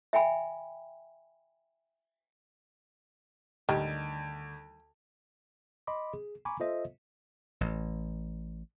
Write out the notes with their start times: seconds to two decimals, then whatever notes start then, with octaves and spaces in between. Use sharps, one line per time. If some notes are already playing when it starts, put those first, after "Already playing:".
0.13 E5 G5 G#5 B5
3.69 D2 D#3 G3
5.87 D#5 B5 C6 D6
6.13 G#4
6.45 G#5 A#5 B5 C#6 D6
6.60 F4 A4 C5 D#5 E5
7.61 A1